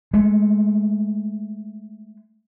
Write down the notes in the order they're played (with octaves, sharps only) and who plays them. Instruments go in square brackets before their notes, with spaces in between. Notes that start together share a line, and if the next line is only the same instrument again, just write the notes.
[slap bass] G#3 A3